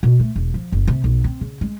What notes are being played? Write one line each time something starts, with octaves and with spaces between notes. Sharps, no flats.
B2
A3
E1
F3
F#1
C3
B1
C4
C#3
G#3